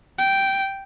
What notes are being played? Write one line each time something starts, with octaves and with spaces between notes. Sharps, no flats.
G5